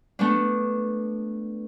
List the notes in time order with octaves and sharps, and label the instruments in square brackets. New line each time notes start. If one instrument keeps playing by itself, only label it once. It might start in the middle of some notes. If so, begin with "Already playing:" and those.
[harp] A3 B3 D4